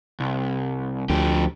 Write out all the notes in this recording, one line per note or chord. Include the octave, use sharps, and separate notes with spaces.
C2
D2 F3 G4